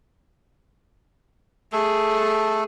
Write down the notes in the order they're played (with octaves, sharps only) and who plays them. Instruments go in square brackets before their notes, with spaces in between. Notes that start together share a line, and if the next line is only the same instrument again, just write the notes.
[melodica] A3 A4 [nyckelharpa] G#4